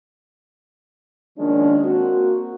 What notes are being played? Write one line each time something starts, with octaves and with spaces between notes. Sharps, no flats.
D#3 F3 G#3 A#3 C#4 D4
A#3 C4 F#4